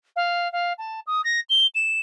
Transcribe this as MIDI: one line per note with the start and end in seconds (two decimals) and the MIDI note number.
0.16 0.51 77
0.53 0.73 77
0.78 1.00 81
1.07 1.22 87
1.24 1.40 94
1.50 1.67 103
1.75 2.00 100